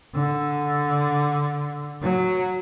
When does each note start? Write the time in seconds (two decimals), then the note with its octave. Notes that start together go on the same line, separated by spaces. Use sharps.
0.14 D3
2.01 F#3